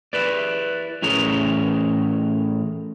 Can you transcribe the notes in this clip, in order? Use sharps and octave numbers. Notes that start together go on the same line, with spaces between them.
E4 B4 D5
A2 E3 C#4 G#4 A#4 A#5